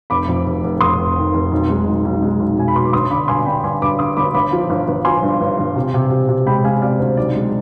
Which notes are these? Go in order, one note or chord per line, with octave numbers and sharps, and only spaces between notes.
F1 B5 D6
F2
F1
F1
F1 C6 D#6
F1
D#3
F1
B1
G#3
B1
B1
G#3
B1
B1 G#5
B5
B2 C6
D6
G1 C6 D#6
D3 B5 D6
G2 G#5 C6
D3 G5 B5
G2 G#5 C6
G2 B5 D6
D3 C6 D#6
G1 B5 D6
G1 B5 D6
F3
G1
G1
F3 G#5 C6
G2
G1
G1
C3
C3
C3
C3
G#3 G5 B5
G#3 F5 G#5
C3 D5 F5
D2 C5
B1 D5
G#3